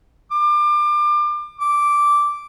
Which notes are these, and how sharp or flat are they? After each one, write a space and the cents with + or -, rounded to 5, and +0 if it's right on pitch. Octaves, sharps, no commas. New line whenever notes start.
D6 +30
D6 -5